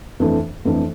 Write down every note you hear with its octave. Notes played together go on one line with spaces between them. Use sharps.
F2 E3 A3 D4 A4
F2 E3 A3 D4 A4